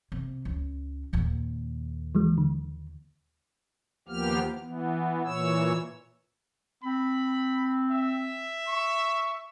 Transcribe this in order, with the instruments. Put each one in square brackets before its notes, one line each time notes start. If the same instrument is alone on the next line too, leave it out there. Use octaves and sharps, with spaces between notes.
[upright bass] C3
C#2
D#2 A#2
[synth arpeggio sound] E3 F#3 G#3
D3
[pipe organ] D#2 F3 A#3 B3 G4 F6
E3 B3
A#2 E3 C#5 E6
[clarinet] C4 [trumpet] B5
[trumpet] E5
[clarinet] C#6